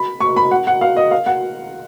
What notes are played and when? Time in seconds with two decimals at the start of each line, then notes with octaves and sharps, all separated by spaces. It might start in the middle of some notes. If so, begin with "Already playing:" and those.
Already playing: B5
0.20 C#6
0.36 B5
0.51 F#5
0.67 F#5
0.81 F5
0.97 D#5
1.11 F5
1.26 F#5